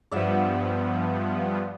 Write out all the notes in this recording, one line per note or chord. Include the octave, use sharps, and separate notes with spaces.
G2 F3 B3 D5 E5 F#5